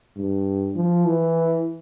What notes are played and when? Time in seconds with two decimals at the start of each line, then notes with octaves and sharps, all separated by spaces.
0.16 G2
0.75 F3
1.05 E3